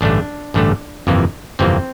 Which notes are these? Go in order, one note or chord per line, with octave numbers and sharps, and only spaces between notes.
A1 G2 D3 A3 D4
A1 G2 D3 A3
G1 F2 C3 E3 A#3
G1 F2 C3 E3 A#3 C4